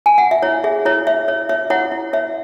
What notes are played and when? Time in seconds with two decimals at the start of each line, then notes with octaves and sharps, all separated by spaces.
0.06 G#5
0.18 F#5
0.31 E5
0.43 E4 C#5
0.64 G#4 E5
0.85 E4 C#5
1.07 C#5 E5
1.28 C#5
1.49 C#5 E5
1.70 E4 C#5 F#5
1.92 E4
2.13 C#5 E5